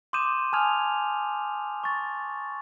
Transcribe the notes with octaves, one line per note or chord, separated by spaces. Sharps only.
C6 D6 D#6 G6 D#7 E7
G#5 A5 D#6 F6 G#6 F7
C#6 A6